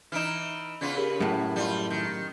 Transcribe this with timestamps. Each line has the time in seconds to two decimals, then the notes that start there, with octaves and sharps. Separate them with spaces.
0.12 E3 D#4 F6 D7 E7
0.81 C#3 B3 F4
0.97 G4 G#4 A#4
1.20 F#2 A2
1.56 G3 F4
1.90 D#3